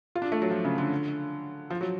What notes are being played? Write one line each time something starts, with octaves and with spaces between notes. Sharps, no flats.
F4
D4
A3
F#3
F3
C#3
D3
F3
F#3